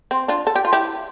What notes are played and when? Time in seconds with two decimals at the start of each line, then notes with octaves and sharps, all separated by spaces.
0.11 C4
0.28 D4 F4
0.47 A4
0.55 G4
0.65 F4
0.73 E4 G4